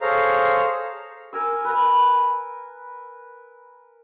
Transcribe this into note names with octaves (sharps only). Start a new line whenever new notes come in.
G#4 A4 C5 C#5 F5 A#5
A#4 G#5 E6
A#4 B4